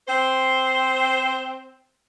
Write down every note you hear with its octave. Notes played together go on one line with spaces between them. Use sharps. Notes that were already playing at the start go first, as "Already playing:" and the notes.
C4 C5